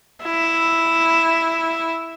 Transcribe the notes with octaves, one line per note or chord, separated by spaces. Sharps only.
E4